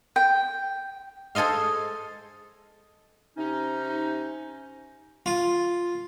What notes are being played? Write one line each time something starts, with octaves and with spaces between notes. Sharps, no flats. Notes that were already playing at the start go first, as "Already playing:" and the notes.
G5
G#4 A4 C5 D#5 F5
C3 C#4 D#4
F4